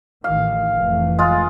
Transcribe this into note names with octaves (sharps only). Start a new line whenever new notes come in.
A1 D#3 F5
F1 E3 A3
G#3 F4